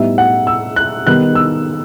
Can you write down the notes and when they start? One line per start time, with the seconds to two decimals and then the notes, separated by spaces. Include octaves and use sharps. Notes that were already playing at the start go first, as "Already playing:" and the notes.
Already playing: A2 G3 B3 D#4 E5
0.18 F#5
0.47 E6
0.76 F#6
1.06 D#3 G3 B3 D#4 F#6
1.35 E6